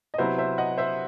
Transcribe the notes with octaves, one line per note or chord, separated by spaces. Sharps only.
D#5
C3 F#3 B3 E4 C5 E5
C5 E5
D#5 F#5
C5 E5